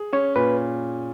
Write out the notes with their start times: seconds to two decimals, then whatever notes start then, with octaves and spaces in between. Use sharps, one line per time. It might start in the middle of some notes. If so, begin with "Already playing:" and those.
Already playing: G#4
0.13 C#4 C#5
0.35 A#2 B4